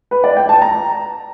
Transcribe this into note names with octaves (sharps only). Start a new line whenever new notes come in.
B4
D5
G5
A5
A#5